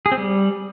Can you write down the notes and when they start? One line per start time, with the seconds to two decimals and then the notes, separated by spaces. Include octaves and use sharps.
0.06 G#4
0.12 C4
0.17 G3